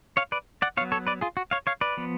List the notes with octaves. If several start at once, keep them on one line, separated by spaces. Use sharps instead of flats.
C#5 F5
B4 D5
D5 F#5
F#3 B3 C#5 F5
A4 C#5
B4 D5
F4 G#4
F#4
C#5 F5
C#5 F5
B4 D5
F3 B3